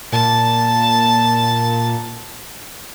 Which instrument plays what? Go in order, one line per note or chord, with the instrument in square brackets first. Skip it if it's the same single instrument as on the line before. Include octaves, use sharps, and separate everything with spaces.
[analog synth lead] A#2 [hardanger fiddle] A5